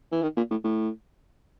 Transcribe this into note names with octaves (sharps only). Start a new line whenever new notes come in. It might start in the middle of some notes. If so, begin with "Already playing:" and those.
E3
D#3
A#2
A2
A2